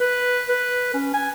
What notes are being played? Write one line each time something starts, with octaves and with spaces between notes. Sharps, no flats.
B4
B4
C#4
G#5